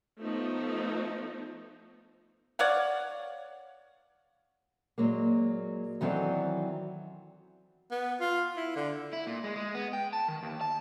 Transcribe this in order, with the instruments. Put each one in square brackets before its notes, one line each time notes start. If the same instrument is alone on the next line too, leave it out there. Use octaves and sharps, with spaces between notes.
[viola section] F3 A3 B3 D#4
[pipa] C#5 D5 F5 F#5
[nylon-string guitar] A#2 F#3 G#3 A#3
D#3 E3 F#3 C4 A4 D5
[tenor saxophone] B3
F4
E4
D3
[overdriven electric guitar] E4
A#2
G#3
G#3
B3
G5
A5
D#3
D#2
A5